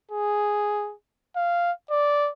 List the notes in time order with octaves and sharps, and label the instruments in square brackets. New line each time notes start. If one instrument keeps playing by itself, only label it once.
[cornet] G#4
F5
D5